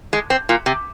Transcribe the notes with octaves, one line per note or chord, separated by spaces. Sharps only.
G#3
C4
A#2
C3